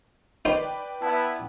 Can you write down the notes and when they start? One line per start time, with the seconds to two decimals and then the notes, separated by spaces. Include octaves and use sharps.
0.45 D#4 B4 C5 D5 G5
1.02 B3 E4 A5